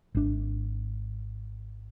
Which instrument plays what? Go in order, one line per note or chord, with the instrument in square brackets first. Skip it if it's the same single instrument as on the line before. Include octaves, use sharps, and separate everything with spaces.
[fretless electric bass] G#1 D4